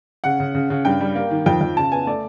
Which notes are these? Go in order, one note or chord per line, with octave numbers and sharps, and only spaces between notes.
C#3 F#5
C#3
C#3
C#3
G2 G5
G3
A#3
D#3
F2 G5
F2
C#3 A5
B3 G#5
A3 D5